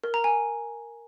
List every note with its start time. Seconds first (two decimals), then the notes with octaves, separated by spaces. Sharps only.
0.04 A#4
0.14 A#5
0.24 G#5